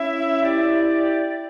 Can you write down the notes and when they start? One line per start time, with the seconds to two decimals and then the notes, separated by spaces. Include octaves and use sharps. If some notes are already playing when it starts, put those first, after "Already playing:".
Already playing: C#4 E4 E5
0.43 E4 G4 D5